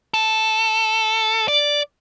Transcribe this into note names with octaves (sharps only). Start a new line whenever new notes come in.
A4
D5